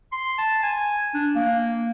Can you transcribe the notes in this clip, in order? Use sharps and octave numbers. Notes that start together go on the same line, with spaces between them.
C6
A5
G#5
D4
A#3